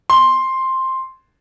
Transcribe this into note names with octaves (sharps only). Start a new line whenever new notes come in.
C6